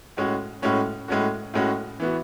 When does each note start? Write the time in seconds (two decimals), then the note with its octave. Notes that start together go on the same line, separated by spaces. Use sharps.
0.17 A2 G#3 C#4 F#4
0.62 A2 G#3 C#4 F#4
1.08 A2 G#3 C#4 F#4
1.54 A2 G#3 C#4 F#4
2.00 E3 B3 F#4